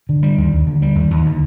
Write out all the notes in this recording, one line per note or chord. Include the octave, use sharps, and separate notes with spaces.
D3
G3
D#2
D#2
D3
G3
D#2
D#2
D3